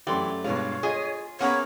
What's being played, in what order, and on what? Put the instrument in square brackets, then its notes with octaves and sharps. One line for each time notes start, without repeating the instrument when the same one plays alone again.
[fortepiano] F#2 A3 G4 [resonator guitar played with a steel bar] E3 [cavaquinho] D5 C6
[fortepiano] G2 B2 G#3 [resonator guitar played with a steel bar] F4 [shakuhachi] C#5
[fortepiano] F4 [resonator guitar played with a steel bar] G#4 [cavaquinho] D#5
[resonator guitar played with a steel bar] A#3 [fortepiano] B3 C#4 G#4 [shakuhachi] C#5 [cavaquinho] F#5 A#5 B5